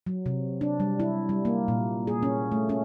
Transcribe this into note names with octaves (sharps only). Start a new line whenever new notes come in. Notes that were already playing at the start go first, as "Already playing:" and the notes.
F#3
C3
D4
G3
E4
G3
A#3
A#2
G#4
C#4
A3
C#4